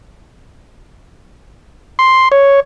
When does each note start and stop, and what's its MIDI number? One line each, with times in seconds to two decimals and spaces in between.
1.99 2.28 84
2.32 2.60 73